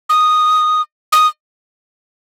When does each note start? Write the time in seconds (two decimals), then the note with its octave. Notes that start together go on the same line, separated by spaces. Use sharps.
0.09 D#6
1.12 D#6